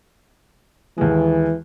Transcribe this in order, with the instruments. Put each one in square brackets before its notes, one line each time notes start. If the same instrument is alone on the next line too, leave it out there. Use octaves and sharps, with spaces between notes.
[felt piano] D#2 G#3 [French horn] E3